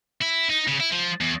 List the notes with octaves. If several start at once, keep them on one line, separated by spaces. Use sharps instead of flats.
E4
D#4
C#3
E4
F3
E2